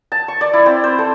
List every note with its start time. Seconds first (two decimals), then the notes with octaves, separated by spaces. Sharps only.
0.12 A5
0.28 C#6
0.41 D5
0.53 E4
0.66 C4
0.84 C5
0.99 A4